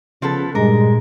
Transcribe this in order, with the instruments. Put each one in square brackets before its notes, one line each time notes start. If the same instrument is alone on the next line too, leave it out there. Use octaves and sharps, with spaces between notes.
[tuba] C#3 [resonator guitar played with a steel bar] F3 B3 A4
[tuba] G2 [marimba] A#2 G3 [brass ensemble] G#3 [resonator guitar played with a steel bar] A#4